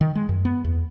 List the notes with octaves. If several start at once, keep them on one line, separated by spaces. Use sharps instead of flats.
D#3
G#3
F#2
B3
E2